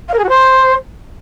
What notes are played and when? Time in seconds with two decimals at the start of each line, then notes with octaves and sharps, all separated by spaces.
0.08 F5
0.13 A#4
0.18 G#4
0.24 F#4
0.29 C5